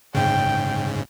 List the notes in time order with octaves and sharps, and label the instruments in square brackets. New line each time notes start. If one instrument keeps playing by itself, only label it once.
[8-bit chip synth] G#2 C#3 [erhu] G5